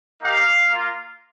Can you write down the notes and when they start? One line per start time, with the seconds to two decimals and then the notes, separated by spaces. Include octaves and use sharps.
0.21 A#3 D#4 G4 F5
0.70 A#3 F4